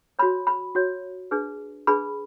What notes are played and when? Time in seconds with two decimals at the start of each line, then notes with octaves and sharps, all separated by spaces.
0.19 F#4 C#5 B5
0.47 B5
0.75 F#4 C#5
1.31 D4 G#4 B4
1.87 D4 G#4 B4 B5